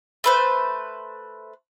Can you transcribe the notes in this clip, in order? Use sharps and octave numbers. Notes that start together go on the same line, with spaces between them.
A3 B4 C5